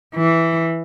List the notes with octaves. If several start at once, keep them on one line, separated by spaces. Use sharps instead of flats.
E3